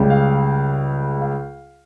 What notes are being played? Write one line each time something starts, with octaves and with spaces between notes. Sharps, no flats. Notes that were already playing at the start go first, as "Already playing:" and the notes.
Already playing: C#2 C#3 G3
F5
F5